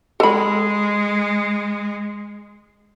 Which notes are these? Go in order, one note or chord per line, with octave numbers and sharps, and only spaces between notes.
G#3 A4 B5